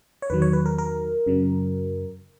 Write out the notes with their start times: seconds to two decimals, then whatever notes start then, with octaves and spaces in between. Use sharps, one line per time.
0.22 C#5
0.30 E2 D#3 F#3 B4
0.42 C#5
0.53 B4
0.66 A#4
0.78 A#4
1.26 F#2 C#3 F#3